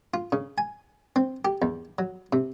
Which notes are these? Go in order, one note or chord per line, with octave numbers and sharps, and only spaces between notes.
F4
C#3
G#5
C4
G4
E2
F#3
C3